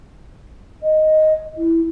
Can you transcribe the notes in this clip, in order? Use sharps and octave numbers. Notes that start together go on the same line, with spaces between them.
D#5
E4